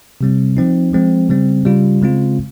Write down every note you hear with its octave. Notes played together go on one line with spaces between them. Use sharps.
C3 G3 C4
F3 C4 D#4
F3 G#3 C4
C#3 G3 C4
C#3 G3 C#4 F4
C#3 G#3 C4 F4